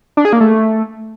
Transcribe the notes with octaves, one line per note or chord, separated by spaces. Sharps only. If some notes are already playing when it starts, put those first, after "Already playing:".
D4
G#4
A#3
A3